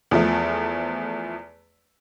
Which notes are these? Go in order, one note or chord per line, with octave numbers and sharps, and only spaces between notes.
E2 F3 A3